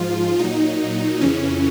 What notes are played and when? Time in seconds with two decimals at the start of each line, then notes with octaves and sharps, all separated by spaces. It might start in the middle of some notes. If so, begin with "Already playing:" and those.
Already playing: G#2 F3 F4
0.39 A#2 F#3 D#4
1.21 F2 C#3 E3 C#4